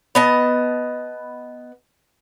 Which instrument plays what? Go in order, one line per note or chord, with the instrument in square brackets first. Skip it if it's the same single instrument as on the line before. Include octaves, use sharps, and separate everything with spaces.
[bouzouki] B3 D#5 A5